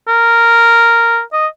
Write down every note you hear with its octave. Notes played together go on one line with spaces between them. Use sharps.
A#4
D#5